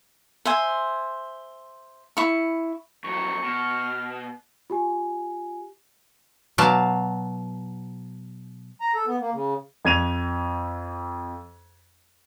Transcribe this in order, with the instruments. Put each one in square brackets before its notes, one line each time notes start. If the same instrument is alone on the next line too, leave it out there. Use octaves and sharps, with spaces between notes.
[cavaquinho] C5 E5 G#5
E4 C#6
[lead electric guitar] F2 F#3 [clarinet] C#6
[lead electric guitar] B2 [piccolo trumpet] F6
[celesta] F4 G4 G#5
[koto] B2 F#3 D5 F5 A5
[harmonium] A#5
A4
B3
A#3
C#3
[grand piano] F2 G#6 D#7 F7